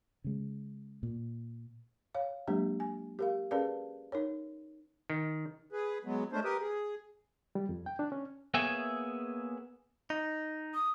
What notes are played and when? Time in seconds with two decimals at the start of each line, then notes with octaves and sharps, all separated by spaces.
0.24 C#3 G#3
1.03 A#2
2.15 C#5 F5
2.47 F#3 G#3 A#3 D4 G4
2.80 G#5
3.19 G4 A#4 F5
3.51 C#4 G#4 A#4 B4 D5 F5
4.12 D#4 A#4 C#5
5.10 D#3
5.72 G#4 B4
6.05 F#3 G#3 B3
6.32 G#3 A3 C#4 D4 C5
6.44 G4 A#4 B4 D#6
6.60 G#4
7.55 G3
7.69 F2
7.86 G5
7.99 D4
8.12 C#4
8.54 A#3 B3 G#4 C#5 E5 G#5
10.10 D#4
10.74 D#6